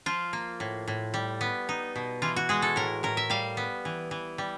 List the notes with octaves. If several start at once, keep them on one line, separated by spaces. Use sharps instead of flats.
F3 F4
A#3
A2
A2
G3
B3
D#4
B2
E3 F4
F#4
G#3 G#4
A4
A2 A#4
A2 A#4
E5
G3 F5
B3
E3
E3
G3